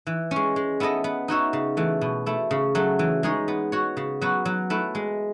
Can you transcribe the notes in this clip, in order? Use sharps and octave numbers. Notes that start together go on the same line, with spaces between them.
E3
C#4
G#3
G#3
B3 E4 A4 D#5
B3
D#4 F#4 C#5 E5
C#3
E3 A3
B2
A3 E4
C#3
F#3 A3
E3
G#3 D#4 G#4 C#5
B3
F#4 C#5
C#3
F#3 B3 F#4
F#3
A3 E4 B4
G#3